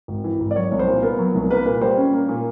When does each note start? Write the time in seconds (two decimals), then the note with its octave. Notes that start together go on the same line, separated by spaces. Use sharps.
0.08 G#1
0.24 E3
0.40 G#1
0.51 D5
0.56 F#3 C#5
0.71 C2
0.79 C5
0.87 A#2
1.03 B3 A#4
1.19 F#3
1.35 C2
1.50 A#3 B4
1.66 A#2 B4
1.81 G3 C5
1.97 C#4
2.13 A#3
2.29 A#2